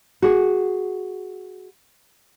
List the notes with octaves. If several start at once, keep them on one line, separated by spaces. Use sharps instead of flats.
F#4 G#4